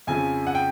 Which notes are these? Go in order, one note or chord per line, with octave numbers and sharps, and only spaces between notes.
F2 C#3 F3 G#5
F#5
G5